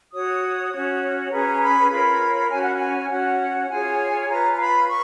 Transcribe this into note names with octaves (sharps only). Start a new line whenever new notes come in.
F#4 C#5 D#6
C#4 F#4 C#5
C#4 G#4 B4 A#5
B5
F4 A#4 C#5 B5
C#4 F#4 C#5 G#5
F#5
G#5
C#4 F#4 C#5 F#5
F4 G#4 C#5 G#5
F4 B4 A#5
A#5
B5
C#6